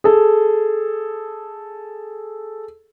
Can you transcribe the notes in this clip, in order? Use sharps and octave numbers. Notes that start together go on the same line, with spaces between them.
G#4 A4